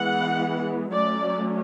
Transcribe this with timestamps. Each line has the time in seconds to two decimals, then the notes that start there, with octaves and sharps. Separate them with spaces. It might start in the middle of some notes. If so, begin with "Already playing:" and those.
Already playing: E3 G#3 B3 F#5
0.93 F#3 A3 C#4 D5